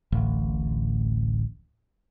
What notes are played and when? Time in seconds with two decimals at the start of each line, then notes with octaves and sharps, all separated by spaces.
0.12 D1 A1